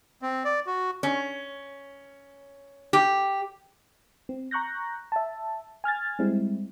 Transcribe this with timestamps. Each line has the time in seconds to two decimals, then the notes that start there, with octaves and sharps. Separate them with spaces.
0.22 C4
0.45 D5
0.67 F#4
1.03 C#4
2.93 G4
4.29 C4
4.51 A#5 C#6 F#6 G6 A#6
5.12 E5 A5
5.84 G#5 F6 G#6 A6
6.19 G3 G#3 C4 E4